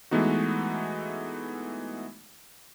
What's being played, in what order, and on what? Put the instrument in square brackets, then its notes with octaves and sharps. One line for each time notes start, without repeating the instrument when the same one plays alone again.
[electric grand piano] E3 G#3 A3 B3 D#4 F#4